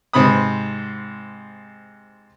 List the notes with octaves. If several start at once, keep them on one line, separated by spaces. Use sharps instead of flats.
G#2 C3 C4 B5 D#6